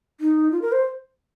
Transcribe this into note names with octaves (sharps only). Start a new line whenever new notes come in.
D#4
F4
A#4
C5